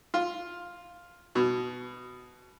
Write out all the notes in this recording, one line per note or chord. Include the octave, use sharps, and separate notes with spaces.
F4
B2